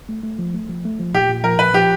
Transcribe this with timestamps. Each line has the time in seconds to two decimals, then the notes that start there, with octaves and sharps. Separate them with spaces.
0.09 A3
0.23 A3
0.39 F3
0.54 A3
0.69 F3
0.85 A3
0.99 F3
1.14 A#2 G4
1.30 A#2
1.44 F3 A#4
1.59 A#2 B4
1.74 F3 G4